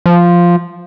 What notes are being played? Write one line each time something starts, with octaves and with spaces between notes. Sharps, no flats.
F3